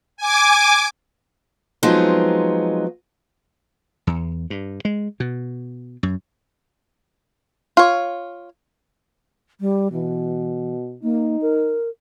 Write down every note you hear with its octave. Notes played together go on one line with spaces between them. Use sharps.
G#5 D6
F3 F#3 G#3 B3 C4 D#4
E2
G2
G#3
B2
F#2
F4 C#5
G3
B2 E3
A#3 D#4
A#4